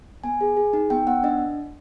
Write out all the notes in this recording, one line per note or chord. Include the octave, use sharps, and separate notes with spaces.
B3 G#5
G#4
G#4
D#4
B3 G5
B3 F#5
D4 D#5